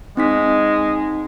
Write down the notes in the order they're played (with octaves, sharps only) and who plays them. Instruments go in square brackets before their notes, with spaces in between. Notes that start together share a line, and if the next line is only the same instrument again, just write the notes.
[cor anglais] G#3 [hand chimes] C4 D#4 B6